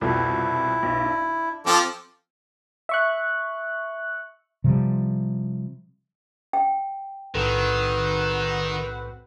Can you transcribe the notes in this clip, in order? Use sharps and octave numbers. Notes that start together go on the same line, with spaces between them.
C2 F2 B2 E4
B1
D4
F3 C4 A4 D6
E5 C#6 F#6
C3 F3 G3
G5
B1 A2 D#3 C4 F#4 A4 B4